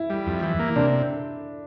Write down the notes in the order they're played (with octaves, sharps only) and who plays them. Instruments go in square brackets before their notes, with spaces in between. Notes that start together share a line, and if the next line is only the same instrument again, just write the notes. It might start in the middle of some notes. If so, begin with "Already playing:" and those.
Already playing: [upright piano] E4
[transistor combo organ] G3
F2
E3
A#3
[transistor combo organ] C3 [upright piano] D4